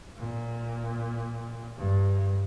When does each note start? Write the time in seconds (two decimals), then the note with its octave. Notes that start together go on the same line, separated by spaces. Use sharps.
0.18 A#2
1.77 G2